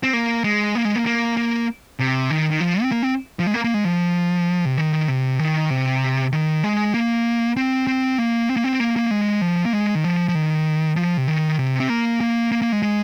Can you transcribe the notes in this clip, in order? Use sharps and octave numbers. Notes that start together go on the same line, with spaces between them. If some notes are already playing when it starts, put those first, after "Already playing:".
C4
A#3
G#3
A#3
G#3
A#3
A#3
A#3
C3
D#3
D#3
F3
C4
A#3
C4
F3
G#3
A#3
A#3
G#3
F3
C3
D#3
D#3
C3
D#3
C3
D#3
G#3
A#3
C4
C4
A#3
C4
A#3
C4
A#3
A#3
G#3
F3
A#3
G#3
D#3
F3
F3
D#3
F3
C3
D#3
C3
C4
A#3
A#3
A#3
A#3
G#3
G#3